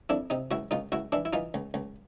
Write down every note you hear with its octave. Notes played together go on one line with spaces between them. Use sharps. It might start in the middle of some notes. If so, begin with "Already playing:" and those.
F2 D4 E4
C3 D#4
C#2 E4 F#4
C#2 D#4 F4
C#2 E4 F#4
E3 D4 E4
E4
E3 D#4 F4
C#2
C#2